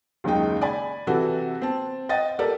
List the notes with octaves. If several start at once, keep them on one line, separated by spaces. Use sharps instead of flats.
F#1 D#2 C#3 G#3 D#4 G5
D5 G#5 B5
C3 E3 F#4 A4
C4 A5
D#5 F#5 G5 A6
G4 A4 A#4 D5